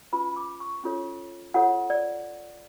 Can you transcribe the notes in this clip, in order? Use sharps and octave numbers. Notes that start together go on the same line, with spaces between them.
C#4 F4 B4 B5
D6
C#6
C#4 F4 A4 C#5
F4 A4 C#5 F#5
D5